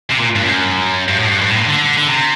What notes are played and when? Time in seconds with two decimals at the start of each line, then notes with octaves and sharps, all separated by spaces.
0.10 C3
0.19 A#2
0.35 G2
0.43 F#2
1.08 G2
1.18 A2
1.27 G2
1.41 G2
1.50 A2
1.58 A#2
1.66 D3
1.98 D3
2.08 C3